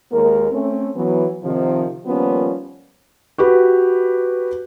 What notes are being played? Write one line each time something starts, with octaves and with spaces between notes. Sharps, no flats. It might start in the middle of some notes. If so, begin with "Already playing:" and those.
D#2 G#3 A#3 A#4
A3 C4 C#4
E3 F#3 B3
C3 D#3 F3
D#3 F3 G3 A#3 B3 C#4
F#4 G4 B4